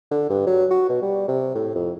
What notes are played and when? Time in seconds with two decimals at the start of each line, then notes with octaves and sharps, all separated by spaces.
0.11 D3
0.29 G2
0.47 F#3
0.70 F#4
0.89 B2
1.02 G3
1.28 C3
1.55 A2
1.75 F2